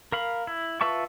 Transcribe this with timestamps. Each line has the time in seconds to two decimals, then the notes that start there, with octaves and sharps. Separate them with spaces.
0.12 A#4 F5 B5
0.47 E4
0.81 F4 B4 E5 A5 C#6